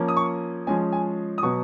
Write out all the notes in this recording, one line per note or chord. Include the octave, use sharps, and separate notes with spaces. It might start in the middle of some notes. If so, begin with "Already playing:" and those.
Already playing: F3 A#3 C#4
D#6
C#6
F3 G#3 C#4 G#5
G#5
D#6
B2 F#3 B3 C#6